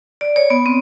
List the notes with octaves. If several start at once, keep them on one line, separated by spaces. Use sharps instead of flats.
D5
C#5
B3
C4